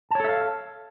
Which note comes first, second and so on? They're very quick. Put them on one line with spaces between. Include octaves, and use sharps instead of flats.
A5 C#5 A4 E5 F5